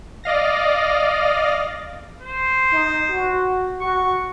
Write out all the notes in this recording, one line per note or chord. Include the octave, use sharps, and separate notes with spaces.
D5 D#5 F5 A#6
C5
D#4
F#4
F#4 C#6